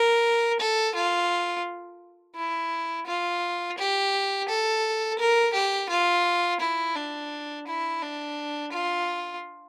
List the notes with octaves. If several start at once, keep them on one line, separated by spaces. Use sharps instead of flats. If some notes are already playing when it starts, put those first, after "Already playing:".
Already playing: A#4
A4
F4
E4
F4
G4
A4
A#4
G4
F4
E4
D4
E4
D4
F4